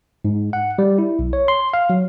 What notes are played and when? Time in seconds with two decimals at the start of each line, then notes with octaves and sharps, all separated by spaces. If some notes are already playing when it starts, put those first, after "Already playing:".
0.25 G#2
0.53 F#5
0.79 G3
0.98 E4
1.19 B1
1.33 C#5
1.48 C6
1.74 F5
1.90 F#3